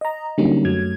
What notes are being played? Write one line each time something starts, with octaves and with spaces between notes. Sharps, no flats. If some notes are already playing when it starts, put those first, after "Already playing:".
D#5 A#5
D3 F#3 G3 A#3 C#4 D#4
F#2 F#3 A3 G#6